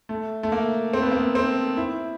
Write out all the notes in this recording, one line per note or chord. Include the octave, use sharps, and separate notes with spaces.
A3
A3
A#3
C4
B3
A#3
B3
C4
E4